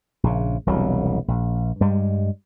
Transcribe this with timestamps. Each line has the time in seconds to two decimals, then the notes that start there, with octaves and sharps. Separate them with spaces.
0.23 A#1 C#3
0.66 E1 C2 B2 F#3
1.28 A#1
1.80 G2 G3 G#3